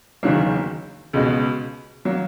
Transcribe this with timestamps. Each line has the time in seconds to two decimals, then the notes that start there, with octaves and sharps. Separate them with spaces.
0.23 F#1 E2 D#3 F#3 A#3
1.13 C#2 B2 G#3
2.05 F#3 A#3